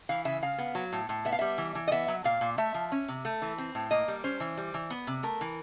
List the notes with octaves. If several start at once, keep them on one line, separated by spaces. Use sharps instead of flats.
E3 F5
C#3 E5
C#3 F5
B3
F#3
A2
A2
B3 E5
F5
G3 E5
E3
E3
D#5
B3 E5
F#3
A#2 F5
A#2
A3 E5
F3
C#4
C3
A3
E3
C4
A2
A#3 D#5
G3
C#4 C5
E3
G3
E3
B3
C3
A3 A#4
E3